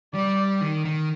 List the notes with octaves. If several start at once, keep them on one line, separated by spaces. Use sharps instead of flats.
G3 D5
D#3
D#3